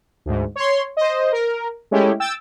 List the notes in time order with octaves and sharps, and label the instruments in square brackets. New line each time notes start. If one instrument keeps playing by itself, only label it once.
[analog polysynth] D2 G#2
C#5 C6
C5 D#5
A#4
G#3 A3 C#4 E4 G4
G5 E6 A6